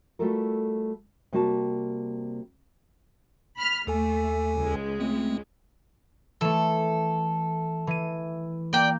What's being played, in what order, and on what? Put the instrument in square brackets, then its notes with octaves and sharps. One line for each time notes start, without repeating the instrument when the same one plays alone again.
[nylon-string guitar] G3 A3 F4 F#4 A4 A#4
C3 G3 A#3 F#4 F5 A5
[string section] B5 F6
[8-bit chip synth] D#2 A4 G#5 [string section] A3
[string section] C#2 G#3
[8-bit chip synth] A3 C4
[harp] E3 A3 [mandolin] A4
[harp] E3 D#7
[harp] A#3 G6 [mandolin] D5 G5